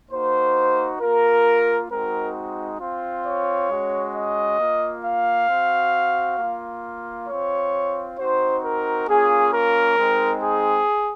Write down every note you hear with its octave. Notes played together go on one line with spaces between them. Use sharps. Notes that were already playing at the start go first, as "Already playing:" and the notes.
A#3 D#4 F#4 C5
A#3 F4 A#4
G#3 C4 D#4 F#4 A#4
C4 F4
C#5
G#3 C#4 F#4
D#5
A#3 F4
F5
C4 F#4
A#3 F4
C4 F4 C#5
C4 D#4 F#4 C5
A#4
A#3 C#4 F4 G#4
A#4
G#3 C4 D#4
G#4